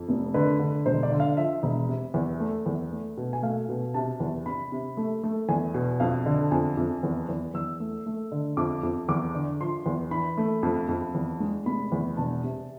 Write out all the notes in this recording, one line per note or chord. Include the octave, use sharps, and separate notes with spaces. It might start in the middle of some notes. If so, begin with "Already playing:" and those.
Already playing: F2
F1
D3 B4
D3
E1 C5
D5
D3
F5
F3 E5
E1
C3
E2
A3
E2
A3
B2
G#5
A3 F5
B2
C3 A5
E2
C3 B5
C3
A3
A3
E2 G#5
B2
F2 F5
D3
F2 G#5
F2
E2
E2
E2 E6
A3
A3
D3
F2 D6
F2
E2 D6
D3
F3 C6
E2
E3 B5
A3
F2
F2
E2
G#3
F1 B5
E2
E1 A5
C3